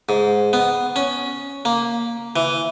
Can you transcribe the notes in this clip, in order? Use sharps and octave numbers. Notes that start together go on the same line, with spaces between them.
G#2
B3
C#4
A#3
E3